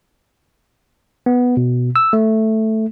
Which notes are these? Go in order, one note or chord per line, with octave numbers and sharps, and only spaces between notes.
B3
B2
E6
A3